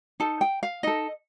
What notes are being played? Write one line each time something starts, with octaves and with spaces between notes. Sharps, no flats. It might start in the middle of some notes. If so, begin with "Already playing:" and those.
D#4 A4 A5
G5
F5
D#4 A4 D#5